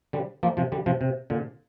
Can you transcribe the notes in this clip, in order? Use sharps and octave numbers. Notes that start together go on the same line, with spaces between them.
D3 G3
F3 A#3
C3 F3
D3 G3
C3 F3
C3
A#2 D3